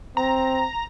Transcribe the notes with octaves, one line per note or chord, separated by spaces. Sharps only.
C4 A#5